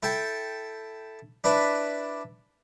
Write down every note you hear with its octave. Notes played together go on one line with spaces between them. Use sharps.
E4 A4 G5 A5
D4 E4 B4